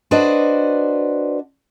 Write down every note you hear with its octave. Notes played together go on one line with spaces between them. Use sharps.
D4 F#4 B4 C5 D5 D#5